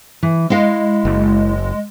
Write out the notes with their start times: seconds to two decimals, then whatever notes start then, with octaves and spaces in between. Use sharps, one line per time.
0.23 E3
0.50 G#3 E4 D#5 F5
1.05 F#1